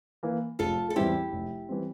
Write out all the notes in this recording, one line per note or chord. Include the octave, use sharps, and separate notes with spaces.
E3 A#3
F1 F4 A4
A4
E2 E3 G3 C4 E4 G4
F1
E3 G3 C4